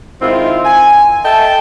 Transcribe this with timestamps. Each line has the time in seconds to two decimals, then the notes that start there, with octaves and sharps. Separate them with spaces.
0.21 G#2 D#3 C4 E4 F4
0.65 G#5
1.24 A4 D#5 E5 G5 A5